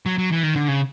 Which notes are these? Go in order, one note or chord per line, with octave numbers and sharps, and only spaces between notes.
F#3
F#3
E3
D#3
D3
C#3